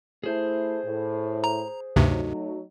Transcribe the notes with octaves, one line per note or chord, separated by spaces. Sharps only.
A3 E4 G#4 C5
A2
A#5
D2 G2 C3 F#3 A3 D#4